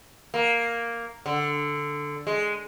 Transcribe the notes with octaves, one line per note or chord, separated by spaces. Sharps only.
A#3
D3
G#3